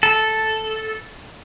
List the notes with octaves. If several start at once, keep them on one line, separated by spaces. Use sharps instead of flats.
A4